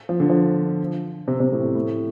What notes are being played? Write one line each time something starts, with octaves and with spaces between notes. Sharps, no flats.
F3
D3
F3
C3
C3
A2
A2
A2